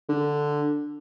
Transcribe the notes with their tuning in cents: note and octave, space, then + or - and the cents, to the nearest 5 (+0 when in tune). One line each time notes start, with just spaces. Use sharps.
D3 +5